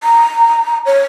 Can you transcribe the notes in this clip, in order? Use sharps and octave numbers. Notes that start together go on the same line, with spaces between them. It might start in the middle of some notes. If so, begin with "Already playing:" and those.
A#5
C#5